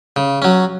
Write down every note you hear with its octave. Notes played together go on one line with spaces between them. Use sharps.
C#3
F#3 C#4